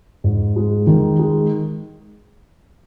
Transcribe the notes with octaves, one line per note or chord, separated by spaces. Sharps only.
G#2
G#3
D#3
G#3